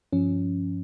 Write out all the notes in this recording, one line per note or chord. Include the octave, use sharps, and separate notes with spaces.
G2 F3 C#4